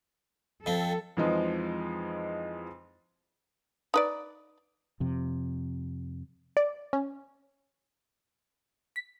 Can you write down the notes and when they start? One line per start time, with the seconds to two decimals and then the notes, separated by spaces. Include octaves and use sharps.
0.66 F2 C4 A4
1.17 F2 E3 F3 G#3 D#4
3.94 D#4 B4 D5
5.00 F2 C3
6.57 D5
6.93 C#4
8.96 B6